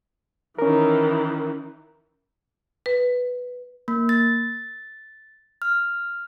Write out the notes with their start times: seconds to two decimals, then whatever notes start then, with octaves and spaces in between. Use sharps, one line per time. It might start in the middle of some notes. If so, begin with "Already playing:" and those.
0.59 D#3 E3 C#4 A#4
2.86 B4
3.88 A#3
4.09 A6
5.62 F6